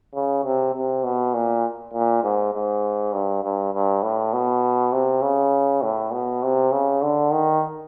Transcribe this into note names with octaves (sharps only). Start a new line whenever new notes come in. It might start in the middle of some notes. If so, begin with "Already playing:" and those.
C#3
C3
C3
B2
A#2
A#2
G#2
G#2
G2
G2
G2
A2
B2
C3
C#3
A2
B2
C3
C#3
D3
D#3